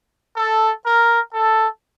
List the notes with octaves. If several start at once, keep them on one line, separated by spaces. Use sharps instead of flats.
A4
A#4
A4